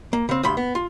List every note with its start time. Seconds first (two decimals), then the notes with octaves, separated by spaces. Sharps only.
0.13 A#3
0.29 C#3 C4
0.43 D2 G2 B5 C6
0.57 B3
0.75 F4